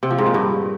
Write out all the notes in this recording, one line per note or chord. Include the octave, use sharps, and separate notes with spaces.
C3
F3
G#2
A#2
G2